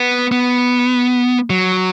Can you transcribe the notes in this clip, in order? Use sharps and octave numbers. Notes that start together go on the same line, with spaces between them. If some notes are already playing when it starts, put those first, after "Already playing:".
Already playing: B3
B3
F#3